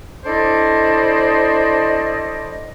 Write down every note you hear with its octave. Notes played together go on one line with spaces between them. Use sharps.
D4 E4 A4 C5 D5 D#5